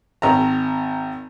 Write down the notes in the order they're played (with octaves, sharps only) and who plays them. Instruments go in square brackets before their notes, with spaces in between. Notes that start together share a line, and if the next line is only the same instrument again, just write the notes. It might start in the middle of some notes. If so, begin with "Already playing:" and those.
[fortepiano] G#1 A#5